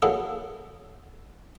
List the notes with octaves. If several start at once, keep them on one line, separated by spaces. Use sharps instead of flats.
F#3 A#3 B3 E4 G#4 A4